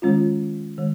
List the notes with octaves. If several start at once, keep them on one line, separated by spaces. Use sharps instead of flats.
D#3 G#3 C#4 F4
D#3 G#3